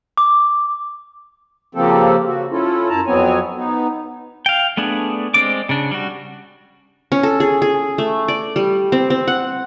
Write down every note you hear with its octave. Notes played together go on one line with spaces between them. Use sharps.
D6
C#3 F3 A#3 C4 G4 A4
C#3 F#4
C#4 E4 F4 A4
F#2 E4 A5 A#5
F2 F#3 B3 C4 C#5 G#5
B3 D#4
F5 G5
A3 B3 D4 G#4
G#3 C4 D5 D6
C#3 D4
G3 F#4
C#4
A4
G#4
G#4
A3
D5
G3
C4
C4
F#5